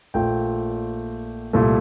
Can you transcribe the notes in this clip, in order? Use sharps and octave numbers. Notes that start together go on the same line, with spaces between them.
A#1 A#2 A3 G5
C2 A#2 A3